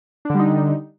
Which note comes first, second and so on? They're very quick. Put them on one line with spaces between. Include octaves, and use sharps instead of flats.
D4 D3 G3 D#4